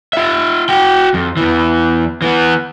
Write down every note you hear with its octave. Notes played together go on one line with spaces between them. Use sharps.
F4 E5
F#4 G5
F2
E2 E3
E3 B3